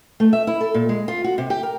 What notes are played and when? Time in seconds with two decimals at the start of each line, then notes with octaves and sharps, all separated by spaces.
0.20 A3
0.33 E5
0.47 E4
0.61 A4
0.74 A#2
0.89 G#3
1.08 F4
1.24 F#4
1.38 C3
1.50 G4
1.63 A#4